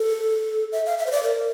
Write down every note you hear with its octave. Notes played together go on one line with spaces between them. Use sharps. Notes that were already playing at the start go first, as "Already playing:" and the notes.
Already playing: A4
E5
F5
E5
C5
D5
A#4